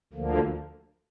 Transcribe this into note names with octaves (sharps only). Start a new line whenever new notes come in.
D2 D3 F3 A#3